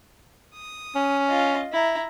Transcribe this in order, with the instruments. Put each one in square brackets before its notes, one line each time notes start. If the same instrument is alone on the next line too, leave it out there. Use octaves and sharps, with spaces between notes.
[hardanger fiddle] D#6
[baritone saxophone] C#4
[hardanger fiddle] F4 D#5
E4 A#5